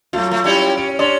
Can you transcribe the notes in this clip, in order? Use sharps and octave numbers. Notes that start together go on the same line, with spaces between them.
F#3 A3 F4
A3
G3 C#4 E4
C#4 D7
C#4 D4 C6